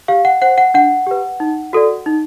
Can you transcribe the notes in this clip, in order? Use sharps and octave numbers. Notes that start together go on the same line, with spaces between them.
G4 F5
F#5
C5 F#5
F#5
D4 F#5
G4 B4
D#4
F#4 A4 D5
D#4